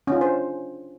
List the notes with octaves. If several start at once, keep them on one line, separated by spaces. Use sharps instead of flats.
C#4 D4 F4 C5